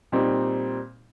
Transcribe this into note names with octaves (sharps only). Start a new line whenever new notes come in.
A#2 G3 C4 D#4